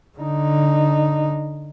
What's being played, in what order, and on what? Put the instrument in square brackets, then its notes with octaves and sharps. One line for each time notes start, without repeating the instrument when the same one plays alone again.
[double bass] D3 D#4